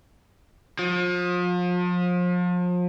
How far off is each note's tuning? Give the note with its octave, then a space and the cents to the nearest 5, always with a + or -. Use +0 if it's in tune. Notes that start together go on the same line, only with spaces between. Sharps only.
F3 +35